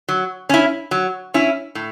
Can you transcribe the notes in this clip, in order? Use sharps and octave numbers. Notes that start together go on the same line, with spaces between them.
F#3
C#4 E4
F#3
C#4 E4
A2